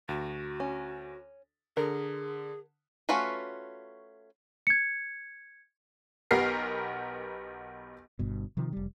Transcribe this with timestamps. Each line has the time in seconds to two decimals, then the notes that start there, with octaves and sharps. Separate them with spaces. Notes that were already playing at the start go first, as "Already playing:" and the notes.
0.09 D2 F#4
0.60 C#4
1.77 D3 G#4 A#4
3.09 A3 C#4 F4 F#4 B4
4.67 G#6 C#7
6.31 B1 B3 G4 A#4 C7
8.19 G1 G2 B2
8.57 C3 D#3 F3
8.73 F1 G3